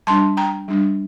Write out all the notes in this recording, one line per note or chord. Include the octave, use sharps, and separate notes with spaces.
G3 D4 A5 C6
G5 A#5
G3 D4